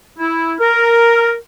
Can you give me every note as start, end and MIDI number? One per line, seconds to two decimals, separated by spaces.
0.19 0.54 64
0.60 1.34 70